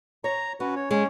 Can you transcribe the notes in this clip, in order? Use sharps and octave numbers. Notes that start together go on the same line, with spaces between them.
C#5 A#5
C#4 F#4 B4
C#5
G#3 C#4 C#5